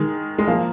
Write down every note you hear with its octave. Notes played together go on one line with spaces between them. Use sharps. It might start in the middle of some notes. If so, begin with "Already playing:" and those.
Already playing: D#3 G#3
G#3
F3 A#3